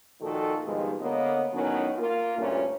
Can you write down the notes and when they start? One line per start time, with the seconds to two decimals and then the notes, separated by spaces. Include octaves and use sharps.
0.21 A#2 D#3 F3 F#4 A4
0.65 G2 B2 D#3 F3 G#3
1.00 D3 A#3 B3 A#4 C#5 D#5
1.54 A2 D#3 F#3 B3 C#4
1.99 A#3 F4 A#4
2.38 D2 G2 A#2 D3 A3 C#4